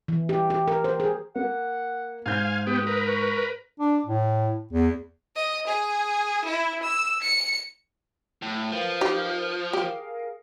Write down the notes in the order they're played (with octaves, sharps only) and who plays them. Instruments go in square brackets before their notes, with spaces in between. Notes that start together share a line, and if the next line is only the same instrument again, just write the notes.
[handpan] E3
G4
G4
A#4
C5
G#4
[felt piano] A#3 [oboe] F#5
[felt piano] G#2 G6 [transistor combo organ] F5 G#5
[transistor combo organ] B3 G4 [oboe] D#6
[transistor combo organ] A#4 B4
[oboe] C#6
[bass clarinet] D4
A2
E2
[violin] D#5
G#4
E4
E6
C#7
[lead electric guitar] A2
[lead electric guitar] F3 [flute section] A#4 B4 F5
[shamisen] D#4 G4
[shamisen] G4 [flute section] G#4 A#4 F5